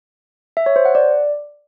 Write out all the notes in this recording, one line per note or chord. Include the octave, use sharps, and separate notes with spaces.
E5
C#5
C5
F#5
D5